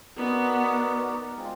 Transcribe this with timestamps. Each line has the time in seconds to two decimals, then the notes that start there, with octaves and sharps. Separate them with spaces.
0.17 B3 D#4 F#4 A#4 D5
1.37 G#3 C4 F4